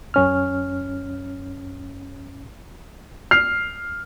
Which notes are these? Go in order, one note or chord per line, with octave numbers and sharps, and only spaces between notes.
F#2 C#4 F6
F6 C7